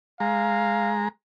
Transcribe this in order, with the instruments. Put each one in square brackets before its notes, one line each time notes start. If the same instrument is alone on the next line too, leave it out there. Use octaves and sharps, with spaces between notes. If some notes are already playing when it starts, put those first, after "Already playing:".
[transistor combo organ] G#3 A#5 [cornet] F5